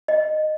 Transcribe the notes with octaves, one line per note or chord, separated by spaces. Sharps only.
D#5